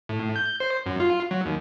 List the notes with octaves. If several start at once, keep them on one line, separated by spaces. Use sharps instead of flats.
A2
G6
C5
F#2
F4
F#3
D#2